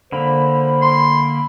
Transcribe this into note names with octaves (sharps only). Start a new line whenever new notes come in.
D3 A#3 C5 B5
C6